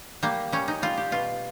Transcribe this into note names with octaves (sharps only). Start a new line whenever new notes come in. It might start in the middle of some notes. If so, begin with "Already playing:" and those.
G3 A#3
G3 C#4
D#4
G3 F4
G4
B2 F4